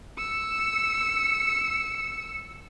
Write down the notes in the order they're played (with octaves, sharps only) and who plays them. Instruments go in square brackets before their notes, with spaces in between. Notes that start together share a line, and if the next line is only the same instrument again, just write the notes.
[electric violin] E6 C#7